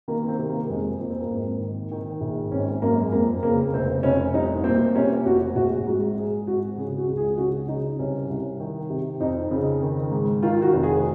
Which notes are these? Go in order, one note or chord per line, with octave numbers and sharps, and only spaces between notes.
D#3 A#3
A#3
C4
C3
A#3
F2 G#3
F2 A#3
C4
A#3
G#1
D#3
D#3
A#1
G#1 C#4
F#2 A#3
G#3
F2 A#3
C#3 A#3
F1 C4
F1 C#4
C2 D#4
A#2 C4
C3 C#4
F1 F#4
A#1 F#4
G#2 F#4
G#2 G#4
G#1 F#4
C#3 G#4
F#4
C#2
G#4
C#3 F#4
C#3 D#4
C2 C#4
C2
D#3
C3
F2 D#4
C#3
D#3
G#2
D#3 F4
F#4
F1
G#4